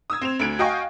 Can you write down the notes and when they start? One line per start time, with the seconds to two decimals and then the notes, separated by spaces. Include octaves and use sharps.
0.10 D#6 E6 G#6
0.21 C4 E7 F7
0.39 D2 D3 G#6 D7
0.59 F#4 D#5 F5 G5 G#5 C#6